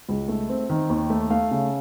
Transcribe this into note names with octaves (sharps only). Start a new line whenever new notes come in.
C#2
A3
C4
D#3
D#2
A3
A3 F5
C#3